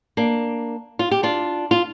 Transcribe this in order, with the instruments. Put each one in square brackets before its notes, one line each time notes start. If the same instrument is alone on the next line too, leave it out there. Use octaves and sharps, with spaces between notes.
[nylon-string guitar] A#3 D4
F4
G4
D4 F4
F4